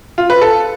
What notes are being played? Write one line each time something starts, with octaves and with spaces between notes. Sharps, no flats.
F4
B4
A4